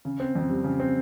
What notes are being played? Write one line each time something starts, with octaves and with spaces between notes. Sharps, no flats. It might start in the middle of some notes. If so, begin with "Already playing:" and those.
C#3
C4
F2
G3
C#3
C4